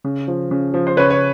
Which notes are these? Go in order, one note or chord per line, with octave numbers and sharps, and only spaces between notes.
C#3
F3
C#3
F3
C5
C#3 B4 C#5
C#5